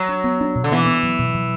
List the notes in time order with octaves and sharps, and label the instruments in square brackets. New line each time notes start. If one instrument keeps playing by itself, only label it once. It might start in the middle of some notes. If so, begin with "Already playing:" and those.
Already playing: [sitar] F#3
[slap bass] D4
B3
D4
B2
[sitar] D3
[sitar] E3 [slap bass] B3
[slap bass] B3
F#3
B2
F#3